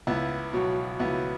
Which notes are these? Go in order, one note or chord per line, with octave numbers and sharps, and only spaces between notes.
C#2 B3 E4
B2 F#3
C#2 B3 E4